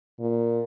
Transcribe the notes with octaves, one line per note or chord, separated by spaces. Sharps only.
A#2